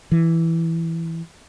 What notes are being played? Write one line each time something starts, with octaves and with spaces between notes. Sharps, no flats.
E3